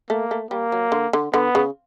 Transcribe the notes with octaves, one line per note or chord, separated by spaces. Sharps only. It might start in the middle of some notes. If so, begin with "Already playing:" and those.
A3 A#3
A3
G3 A#3
F#3
D3
D3
D3 B3
C#3